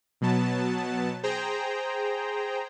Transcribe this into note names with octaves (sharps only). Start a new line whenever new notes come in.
B2 F#3 B3 A5
G#4 C5 G5 A#5